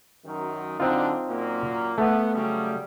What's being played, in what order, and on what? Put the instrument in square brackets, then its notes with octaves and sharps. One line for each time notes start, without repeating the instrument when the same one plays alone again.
[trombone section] F#2 D#3
[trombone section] D3 F#3 D4 [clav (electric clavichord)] C4 D#4 F4
[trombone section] F#2 A#2 A#3
[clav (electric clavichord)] A3 [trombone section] B3
[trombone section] C#3 F#3 G3